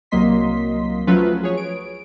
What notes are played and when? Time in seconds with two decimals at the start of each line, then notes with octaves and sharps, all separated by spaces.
0.11 C2 F#3 A#3 D#5 C6 B6
1.07 F3 F#3 A3 C#4 F4 B4
1.43 G#4 C#5
1.57 D7